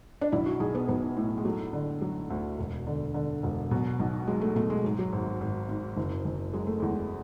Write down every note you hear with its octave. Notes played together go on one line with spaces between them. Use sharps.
D4
B1 E4
F#4
B1 G#4
B3
B1 B3
A2
G#3
F#3 A3
D3
F#3
D2
E1
D3
D3
E1
B2 F#3
B1
F#3 G#3
A3
B2 A3
G#3
G#2 F#3
F#3
G#1
G#1
G#2
F#1
F#1
F#3 G#3
A3
E2 G#3